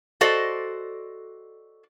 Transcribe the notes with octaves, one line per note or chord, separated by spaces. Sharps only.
F#4 A4 C5 D5 D#5